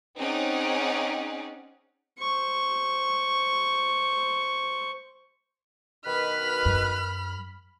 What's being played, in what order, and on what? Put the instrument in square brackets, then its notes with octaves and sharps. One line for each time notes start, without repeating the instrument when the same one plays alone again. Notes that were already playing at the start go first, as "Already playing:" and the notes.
[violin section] C4 C#4 D#4 G#4 D5 F#5
[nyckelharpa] C5 C#6
[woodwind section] B2 D#3 B4 [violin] B5 F6
[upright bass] F#2